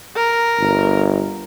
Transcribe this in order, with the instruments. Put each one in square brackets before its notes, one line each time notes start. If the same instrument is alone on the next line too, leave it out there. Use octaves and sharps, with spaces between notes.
[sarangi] A#4
[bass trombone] G1